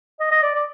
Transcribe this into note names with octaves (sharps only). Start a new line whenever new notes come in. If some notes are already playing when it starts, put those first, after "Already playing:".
D#5
D#5
D5
D5